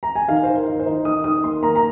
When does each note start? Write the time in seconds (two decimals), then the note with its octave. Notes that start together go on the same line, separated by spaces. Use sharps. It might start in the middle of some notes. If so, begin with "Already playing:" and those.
0.03 A#5
0.15 G#5
0.28 D#3 F5
0.43 D#3 C5
0.55 A#4
0.67 D#4
0.74 A#4
0.79 C5
0.86 D#4
1.05 D#3 D#6
1.24 D#3 D#6
1.44 A#3 C6
1.63 A#3 A#5
1.76 A#5